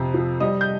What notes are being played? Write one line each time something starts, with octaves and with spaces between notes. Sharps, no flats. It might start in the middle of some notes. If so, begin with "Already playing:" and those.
Already playing: F2 C3
F3
G3 D#5 D#6
G6